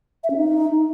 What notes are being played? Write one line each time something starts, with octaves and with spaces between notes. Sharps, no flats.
E5
C#4
D#4